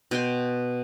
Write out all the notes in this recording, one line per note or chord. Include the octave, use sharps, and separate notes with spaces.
B2 G5 C6